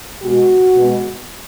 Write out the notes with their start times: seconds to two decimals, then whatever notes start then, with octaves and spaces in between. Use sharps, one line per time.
0.22 B2 G#3 B3 F#4
0.74 B2 G#3 B3